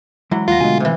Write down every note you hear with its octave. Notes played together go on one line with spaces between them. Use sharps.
E3 F#3 G#3 E4
D#2 F4 F#5 A#6
B2 D3 G#3 A3 G#5
C3 E3